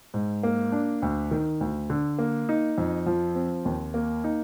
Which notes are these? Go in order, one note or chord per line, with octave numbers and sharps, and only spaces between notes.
G#2
A#3
D4
D2
D#3
D2
D3
A#3
D#4
F2
F3
C4
D#2
A#3
D#4